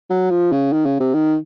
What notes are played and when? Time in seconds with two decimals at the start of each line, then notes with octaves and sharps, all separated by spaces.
0.10 F#3
0.30 F3
0.52 C#3
0.73 D#3
0.86 C#3
1.00 C3
1.14 D#3